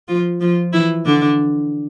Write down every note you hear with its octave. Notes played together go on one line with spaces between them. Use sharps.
F3 F4
F3 F4
E3 E4
D3 D4